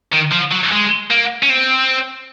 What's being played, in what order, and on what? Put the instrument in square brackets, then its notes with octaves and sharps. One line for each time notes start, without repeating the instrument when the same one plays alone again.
[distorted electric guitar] D#3
F3
F#3
G#3
A#3
C#4
C4